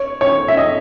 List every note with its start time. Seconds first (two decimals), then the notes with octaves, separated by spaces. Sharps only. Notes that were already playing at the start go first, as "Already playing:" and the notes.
Already playing: C#5
0.21 C#5
0.48 E5
0.57 D#5